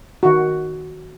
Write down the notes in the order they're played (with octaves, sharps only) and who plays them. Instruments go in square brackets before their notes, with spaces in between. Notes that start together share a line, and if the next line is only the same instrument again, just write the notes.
[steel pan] D#3 F#4